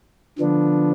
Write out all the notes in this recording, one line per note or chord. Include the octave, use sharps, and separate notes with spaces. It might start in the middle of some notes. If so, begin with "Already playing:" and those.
D3 F3 B3 D4